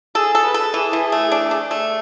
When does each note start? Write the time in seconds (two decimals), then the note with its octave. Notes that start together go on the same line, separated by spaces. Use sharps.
0.15 G#4 A4
0.35 A4
0.44 B4
0.54 A4
0.74 E3 G#4
0.93 E3
1.12 A3
1.32 D4
1.51 D4
1.71 A3